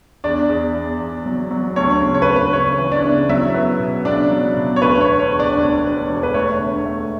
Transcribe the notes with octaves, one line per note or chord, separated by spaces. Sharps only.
E2 D4 D5
E2
E2
E2
F#3
F#3
D2 C#5
C#3
C#5
B4
D2
B4
C#3 C#5
E3
D4 D5
C#3
F#3 E4 E5
B3
B2
C#2 D4 D5
F#3
B2
C#5
D2 B4
C#5
E1
C#5
E1
D4 D5
D2
E1
E1
B4
A3 C#5
D3
A3